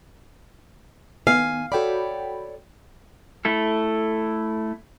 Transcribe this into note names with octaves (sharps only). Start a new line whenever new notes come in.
D#3 B3 F5 G#5
F#4 A4 C#5 D5 G5 B5
A3 E4 A4